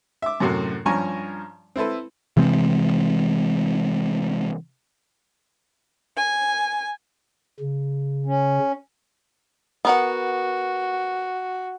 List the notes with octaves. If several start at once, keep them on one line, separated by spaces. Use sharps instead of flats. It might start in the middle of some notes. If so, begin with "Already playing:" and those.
E5 D6
F#2 A2 C3 F#4 C6
G2 F3 C#4 G#5 A#5 C#6
C4 E4 A4 B4
C3 E3 G#3 C4
G#5
C#3
C#4
B3 F#4 A#4 F#5